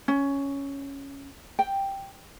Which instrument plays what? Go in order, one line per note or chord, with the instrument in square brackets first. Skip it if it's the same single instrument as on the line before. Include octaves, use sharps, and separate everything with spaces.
[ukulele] C#4
G5